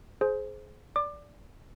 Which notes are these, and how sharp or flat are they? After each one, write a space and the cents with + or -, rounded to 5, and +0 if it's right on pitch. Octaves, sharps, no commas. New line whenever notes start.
G#4 +25 C5 +0
D5 -10 D6 +25